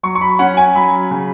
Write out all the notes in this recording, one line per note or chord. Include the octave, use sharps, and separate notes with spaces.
F#3 C#6
C#6
B5
C#4 F#5
G#5
F#3 B5
C#3